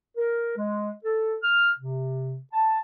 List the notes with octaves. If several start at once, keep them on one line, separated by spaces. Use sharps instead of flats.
A#4
G#3
A4
F6
C3
A5